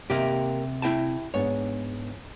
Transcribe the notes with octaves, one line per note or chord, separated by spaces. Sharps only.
C3 A#3 G4
E4 G5 A5
G#2 B3 D4 C#5